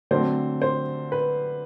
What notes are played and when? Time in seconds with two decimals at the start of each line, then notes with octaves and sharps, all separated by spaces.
0.11 D3 F#3 A3 C4 C5
0.62 C5
1.12 B4